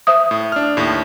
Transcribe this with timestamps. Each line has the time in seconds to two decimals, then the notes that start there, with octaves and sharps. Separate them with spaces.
0.07 C5 E5 D#6
0.31 A2
0.52 D4 F6
0.77 D#2 A2